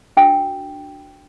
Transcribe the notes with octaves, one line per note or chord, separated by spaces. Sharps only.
D4 F#4 A#4 G5